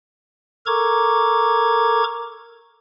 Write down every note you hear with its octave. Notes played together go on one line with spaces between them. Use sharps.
A4 A#4 A#5 C#6 D6 G#6